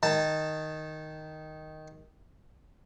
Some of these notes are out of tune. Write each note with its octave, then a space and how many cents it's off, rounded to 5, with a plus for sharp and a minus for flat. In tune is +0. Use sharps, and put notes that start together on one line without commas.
D#3 +0 A5 +10